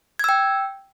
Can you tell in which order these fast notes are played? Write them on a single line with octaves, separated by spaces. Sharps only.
G#6 E6 G5